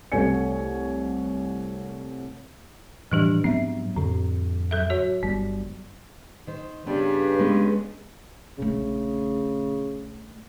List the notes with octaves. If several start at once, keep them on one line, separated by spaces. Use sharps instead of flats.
C2 A3 C#5 G#5 C#7
A2 E3 F3 G3 D4 G4
G#2 F#3 B3 C4 E5
F2 A2 D3
F#3 A4 E5
F#4 C#5
G1 G3 B3
D#3 C5
G2 C#3 B3
G#3 B3 C#4
A#1 C#3 A3